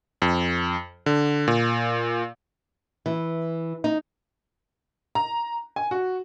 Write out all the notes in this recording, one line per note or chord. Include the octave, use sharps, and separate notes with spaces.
F2
D3
A#2
E3
D#4
A#5
G#5
F#4